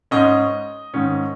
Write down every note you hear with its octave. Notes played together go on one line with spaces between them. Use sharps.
G#2 G#3 C#4 D#5
G#2 D#3 C#4